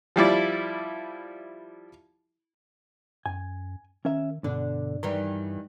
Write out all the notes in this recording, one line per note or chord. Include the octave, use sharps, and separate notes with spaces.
F3 G3 E4 D5
F#2 G#5
D#3 C#4 A#4 E5
G2 B2 D3 D4
D#3 E3 G3 A#5